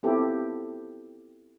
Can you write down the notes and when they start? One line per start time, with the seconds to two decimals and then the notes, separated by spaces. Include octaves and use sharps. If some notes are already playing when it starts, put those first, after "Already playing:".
0.03 B3 C4 E4 F4 G4 A4